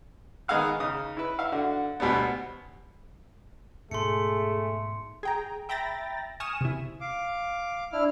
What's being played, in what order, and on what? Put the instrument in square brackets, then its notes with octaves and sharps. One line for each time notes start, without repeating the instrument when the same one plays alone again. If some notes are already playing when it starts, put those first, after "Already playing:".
[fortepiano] D#3 B3 G#4 D#5 F5 F#6
C#3 D#4 D#6
E4 B4
E5 F5
D3 F#4
D2 B2 G3 B3
[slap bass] G#2 B2 [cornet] A3 [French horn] G#4 [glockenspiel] C6 C#7
[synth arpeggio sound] G#4 G5 A#5
E5 G5 A#5 B5 A6 A#6
G#5 C#6 D#6 F6 E7
C3 E4
[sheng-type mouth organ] F5 D6
[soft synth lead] D4 [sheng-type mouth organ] E4 F6